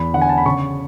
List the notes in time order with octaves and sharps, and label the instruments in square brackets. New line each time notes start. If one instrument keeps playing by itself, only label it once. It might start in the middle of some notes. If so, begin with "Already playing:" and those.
Already playing: [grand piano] E2 B5
D3 F#5
G#5
A5
B5
C#3 C#6